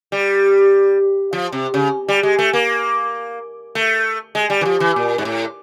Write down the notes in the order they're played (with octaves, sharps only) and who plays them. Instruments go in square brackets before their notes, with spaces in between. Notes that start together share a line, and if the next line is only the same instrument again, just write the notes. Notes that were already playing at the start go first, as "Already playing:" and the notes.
[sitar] G3
F3
C3
C#3
G3
G#3
A3
A#3
A3
G#3
G3
E3
F3
E3
A#2
G#2
A2